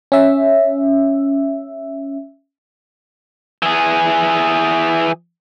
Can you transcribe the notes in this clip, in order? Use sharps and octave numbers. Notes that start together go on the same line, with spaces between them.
C#4 E5
E3 G#4